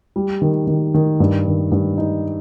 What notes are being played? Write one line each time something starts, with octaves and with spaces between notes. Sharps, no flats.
G3
D#3
D#3
D#3
G2
D#3
G2
D#4